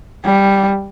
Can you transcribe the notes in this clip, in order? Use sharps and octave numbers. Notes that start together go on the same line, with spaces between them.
G3